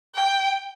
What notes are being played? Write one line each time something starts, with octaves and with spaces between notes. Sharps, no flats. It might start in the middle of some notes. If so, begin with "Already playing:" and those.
G5